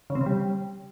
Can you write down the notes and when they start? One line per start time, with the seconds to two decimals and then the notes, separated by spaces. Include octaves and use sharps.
0.10 C#3
0.15 C4
0.21 C#3
0.26 G3